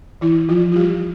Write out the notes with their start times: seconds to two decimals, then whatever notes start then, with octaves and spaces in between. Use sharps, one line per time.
0.21 E3 E4
0.49 F3 F4
0.72 F4
0.76 G3 G4